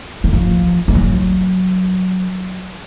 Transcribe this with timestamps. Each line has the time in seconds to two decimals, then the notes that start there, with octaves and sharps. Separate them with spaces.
0.24 D#3
0.33 F3
0.88 G#3
0.95 F#3